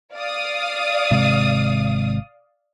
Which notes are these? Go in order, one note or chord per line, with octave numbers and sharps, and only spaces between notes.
D5 F5 D#6
G#1 C3 G#3